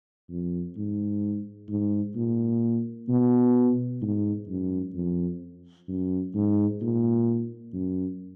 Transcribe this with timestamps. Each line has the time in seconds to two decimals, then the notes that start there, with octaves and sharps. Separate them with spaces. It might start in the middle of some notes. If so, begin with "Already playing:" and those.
0.30 F2
0.76 G#2
1.69 G#2
2.15 A#2
3.09 B2
4.02 G#2
4.48 F#2
4.94 F2
5.88 F#2
6.34 G#2
6.81 A#2
7.73 F#2